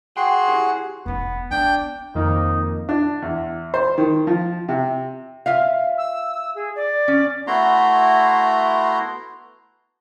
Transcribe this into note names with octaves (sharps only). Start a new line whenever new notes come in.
F#4 G#4 F#5 G5 C6
E4 G4 C#5
E1 B3 D#4
B3 D4 G5
F2 D#3 A#3 D#4
D4
E2
C5
D#3
F3
C3
F4 E5 F5
E6
G#4
D5
C#4
A3 B3 E4 F#4 A#5 C6